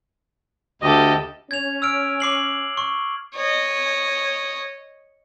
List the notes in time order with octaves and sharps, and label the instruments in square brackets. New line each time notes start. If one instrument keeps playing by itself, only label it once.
[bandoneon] D2 D#5 [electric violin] G4 A4
[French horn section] C#4 [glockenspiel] G#6 F7
[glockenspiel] E6 F6 D7
D6 C7 F#7
C#6
[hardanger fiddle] C#5 D#5